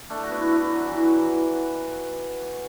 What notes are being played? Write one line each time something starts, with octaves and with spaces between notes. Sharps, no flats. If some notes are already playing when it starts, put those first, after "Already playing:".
A3 D4
F#4
B3 E4
B3 E4
F#3
E3
F#3
E3